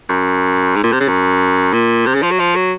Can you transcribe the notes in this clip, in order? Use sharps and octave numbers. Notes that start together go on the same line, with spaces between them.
F#2
G#2
A#2
C3
C#3
F#2
A#2
C3
C#3
F3
F#3
F3
F#3